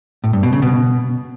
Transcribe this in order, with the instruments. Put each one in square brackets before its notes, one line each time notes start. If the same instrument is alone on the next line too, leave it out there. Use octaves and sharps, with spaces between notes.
[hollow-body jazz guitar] A2
G2
B2
C#3
B2